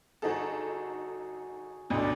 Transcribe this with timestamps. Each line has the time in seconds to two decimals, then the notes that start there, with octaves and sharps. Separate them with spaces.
0.22 G1 D#4 F#4 G#4 A4
1.90 A1 D2 B2 D4